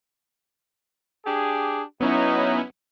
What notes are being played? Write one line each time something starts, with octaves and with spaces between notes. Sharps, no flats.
D4 G4 G#4
F#3 B3 C#4 D#4 E4